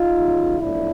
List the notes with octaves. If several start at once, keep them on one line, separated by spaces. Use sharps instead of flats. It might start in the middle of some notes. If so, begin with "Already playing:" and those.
Already playing: D#4 F4
D#2 C#3 F#3
B1 A2 F3 D4 E4